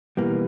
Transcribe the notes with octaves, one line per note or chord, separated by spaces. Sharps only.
B2 E3 G3 A#3